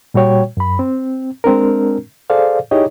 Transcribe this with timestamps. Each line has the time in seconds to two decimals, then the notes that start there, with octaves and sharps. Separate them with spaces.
0.14 A#2 G3 F#4 C#5 G5
0.57 F#2 B5
0.79 C4
1.44 G#3 C4 D4 A#4
2.30 G#4 A4 C5 D5 F5
2.71 D#4 E4 G4 G#4 C#5 D#5